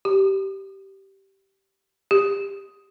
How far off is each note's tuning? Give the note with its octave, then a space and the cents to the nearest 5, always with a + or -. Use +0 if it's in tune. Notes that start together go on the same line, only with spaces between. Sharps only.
G4 -15
G4 +10